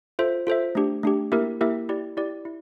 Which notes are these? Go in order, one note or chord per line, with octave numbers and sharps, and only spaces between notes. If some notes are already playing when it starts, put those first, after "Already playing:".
F4 A4 C5 E5
F4 A4 C5 E5
A3 D4 G4
A3 D4 G4
A#3 E4 G4 A#4 E5
A#3 E4 G4 A#4 E5
E4 G4 D5
E4 G4 D5
E4